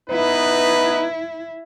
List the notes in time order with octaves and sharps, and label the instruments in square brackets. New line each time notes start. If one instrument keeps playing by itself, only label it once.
[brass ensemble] B3 D#4 B4 [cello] E4